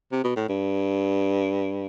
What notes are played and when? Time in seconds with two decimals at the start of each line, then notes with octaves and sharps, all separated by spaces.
0.12 C3
0.24 B2
0.36 A2
0.49 G2